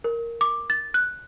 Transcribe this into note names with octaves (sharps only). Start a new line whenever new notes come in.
A#4
D6
A6
F#6